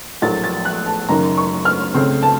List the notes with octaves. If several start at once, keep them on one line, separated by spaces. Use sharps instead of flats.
A#1 A2 F#3 A#3 A6
A6
F#6
A5
F#1 F#2 D#3 A#3 A#5
C#6
F6
C#2 C#3 A3 C4
A5